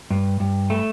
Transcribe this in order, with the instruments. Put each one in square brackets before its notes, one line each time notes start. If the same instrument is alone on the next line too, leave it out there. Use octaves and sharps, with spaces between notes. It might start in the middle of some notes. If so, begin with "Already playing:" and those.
[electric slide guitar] G2
G2
A3